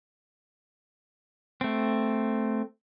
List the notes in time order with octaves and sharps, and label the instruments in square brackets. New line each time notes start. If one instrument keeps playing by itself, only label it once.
[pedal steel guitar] A3 C4